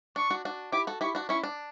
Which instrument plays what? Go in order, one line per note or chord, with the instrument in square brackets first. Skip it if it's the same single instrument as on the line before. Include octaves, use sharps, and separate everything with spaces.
[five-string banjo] D4 [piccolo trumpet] C#6
[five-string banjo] D4 F#4
D4 F#4
[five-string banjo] E4 G4 [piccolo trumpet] D6
[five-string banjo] F#4 A4
[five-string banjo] E4 G4 [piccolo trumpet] C#6
[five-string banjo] D4 F#4
[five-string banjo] C#4 E4 [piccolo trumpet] C#6
[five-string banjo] D4